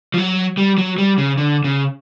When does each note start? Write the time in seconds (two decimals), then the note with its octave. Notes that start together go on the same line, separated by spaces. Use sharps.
0.14 F3
0.18 F#3
0.57 G3
0.78 F#3
0.98 G3
1.18 C#3
1.38 D3
1.64 C#3